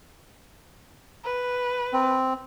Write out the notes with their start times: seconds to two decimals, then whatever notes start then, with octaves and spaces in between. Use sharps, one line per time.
1.25 B4
1.93 C4